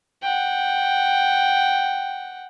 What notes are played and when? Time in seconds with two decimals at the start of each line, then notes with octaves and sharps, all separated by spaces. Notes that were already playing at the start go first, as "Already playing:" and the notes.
0.22 F#5 G5